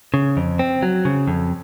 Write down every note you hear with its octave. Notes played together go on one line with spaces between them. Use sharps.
C#3
F2
C4
F#3
C#3
F2